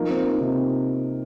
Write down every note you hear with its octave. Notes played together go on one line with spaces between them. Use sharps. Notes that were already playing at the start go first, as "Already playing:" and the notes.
Already playing: F3 A#3 D#4
C4
D#4
C3